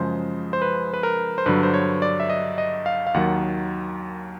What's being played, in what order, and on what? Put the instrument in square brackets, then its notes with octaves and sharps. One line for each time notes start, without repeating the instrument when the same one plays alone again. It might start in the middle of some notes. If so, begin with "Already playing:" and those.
Already playing: [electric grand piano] F#2 C#3 F3 G#3 C5
C5
B4
B4
A#4
C5
G2 D3 F#3 B4
C5
C#5
D5
E5
D#5
D#5
F5
F5
D#2 D#3 F#3 F#5